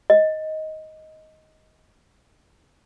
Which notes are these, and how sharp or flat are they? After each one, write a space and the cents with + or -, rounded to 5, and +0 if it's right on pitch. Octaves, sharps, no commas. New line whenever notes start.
D#5 +10